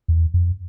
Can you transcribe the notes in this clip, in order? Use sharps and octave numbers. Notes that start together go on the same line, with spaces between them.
E2
F2